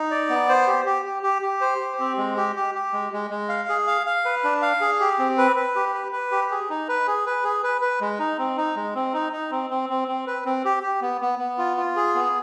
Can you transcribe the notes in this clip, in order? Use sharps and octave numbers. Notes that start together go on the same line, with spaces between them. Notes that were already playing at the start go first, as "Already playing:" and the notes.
Already playing: D#4
D5
B3
C5
G4
G4
G4
G4
G4
C5
G4
C4
G#3
G4
G4
G4
G#3
G#3
G#3
F5
G#4
F5
F5
B4
D4
F5
G#4
G4
C4
B4
B4
G4
B4
B4
G4
G#4
D#4
B4
G#4
B4
G#4
B4
B4
G#3
D#4
C4
D#4
G#3
C4
D#4
D#4
C4
C4
C4
C4
B4
C4
G4
G4
B3
B3
B3
F4
F4
G#4
B3